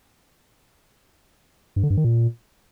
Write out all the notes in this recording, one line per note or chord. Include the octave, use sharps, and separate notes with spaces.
G2
D3
G2
D#3
A#2